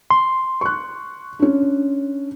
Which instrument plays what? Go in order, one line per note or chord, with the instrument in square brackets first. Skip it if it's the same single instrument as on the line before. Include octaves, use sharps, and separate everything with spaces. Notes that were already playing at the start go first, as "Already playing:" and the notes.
[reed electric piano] C6
[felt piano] C#6 F#6
C#4 D4